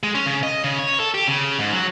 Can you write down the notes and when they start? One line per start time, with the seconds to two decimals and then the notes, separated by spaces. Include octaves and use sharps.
0.03 G#3
0.15 C#4
0.26 C#3
0.43 D#5
0.64 C#3
0.79 C#5
1.00 A4
1.14 G4
1.27 C#3
1.59 G#2
1.72 F#3